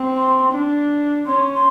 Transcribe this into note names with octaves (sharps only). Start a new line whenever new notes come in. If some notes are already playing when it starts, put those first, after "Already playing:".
Already playing: C4
C6
D4
C#4 C6
C#6
C6